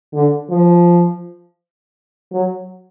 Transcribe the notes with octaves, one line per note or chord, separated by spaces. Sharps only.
D3
F3
F#3